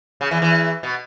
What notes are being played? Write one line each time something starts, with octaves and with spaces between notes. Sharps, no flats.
C#3
E2 E3
E2 E3
B2